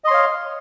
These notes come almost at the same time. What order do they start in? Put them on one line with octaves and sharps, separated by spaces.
D#5 C6 C#5 F5